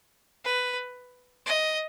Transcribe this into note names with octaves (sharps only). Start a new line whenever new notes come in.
B4
D#5